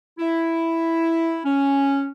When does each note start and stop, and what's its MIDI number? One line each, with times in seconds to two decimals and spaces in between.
0.19 1.39 64
1.45 2.07 61